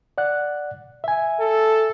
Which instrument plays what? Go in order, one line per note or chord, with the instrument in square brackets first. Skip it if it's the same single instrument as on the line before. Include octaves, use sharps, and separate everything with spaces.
[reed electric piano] D5 F#5 F#6
E5 G#5
[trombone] A4